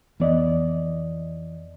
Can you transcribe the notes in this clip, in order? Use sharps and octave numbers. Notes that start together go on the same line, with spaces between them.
F2 E3 B3 D5 D#5